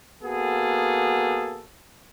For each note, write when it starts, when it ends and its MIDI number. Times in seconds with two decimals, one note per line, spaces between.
0.24 1.62 58
0.24 1.62 59
0.24 1.62 66
0.24 1.62 68
0.24 1.62 69